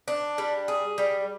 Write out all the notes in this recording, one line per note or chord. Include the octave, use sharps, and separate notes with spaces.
D4
G3
G#4
G3